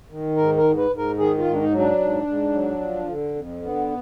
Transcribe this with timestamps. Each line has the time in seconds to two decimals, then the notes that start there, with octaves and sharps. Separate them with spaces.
0.09 D#3
0.36 G#2 A#4
0.57 A#4
0.63 G#2
0.77 B4
0.91 G#2
0.97 A#4
1.18 D#3 G#4
1.38 F4
1.45 G#2
1.53 D4
1.59 D#4
1.72 F#3
1.79 D4
1.99 G#2
2.26 G#2
2.53 F#3
2.81 F3
3.08 D3
3.35 F2
3.62 D3 B3